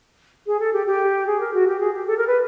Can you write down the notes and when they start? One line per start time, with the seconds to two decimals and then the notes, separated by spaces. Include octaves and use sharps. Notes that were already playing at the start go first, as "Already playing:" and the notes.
0.46 G#4
0.60 A4
0.73 G4
0.86 G4
1.26 G#4
1.40 A#4
1.53 F#4
1.67 G4
1.80 G#4
1.93 G4
2.07 A4
2.17 A#4
2.27 B4